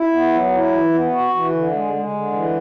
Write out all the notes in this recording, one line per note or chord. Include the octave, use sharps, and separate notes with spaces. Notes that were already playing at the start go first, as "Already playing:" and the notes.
Already playing: E4
B3
F#3
E4
E3
B3
F#4
E3
D3
G#3
G#3
D3
E3